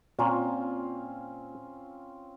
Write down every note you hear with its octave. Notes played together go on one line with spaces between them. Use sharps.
A#2 C4 C#4 F4